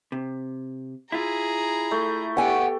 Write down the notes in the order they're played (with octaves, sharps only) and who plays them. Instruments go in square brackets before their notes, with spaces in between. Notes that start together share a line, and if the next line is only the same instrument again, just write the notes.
[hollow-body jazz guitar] C3
[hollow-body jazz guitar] E4 F4 [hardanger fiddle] G#4 A#5
[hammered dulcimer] A3
[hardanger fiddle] B3 G4 [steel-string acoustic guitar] F#5 G#5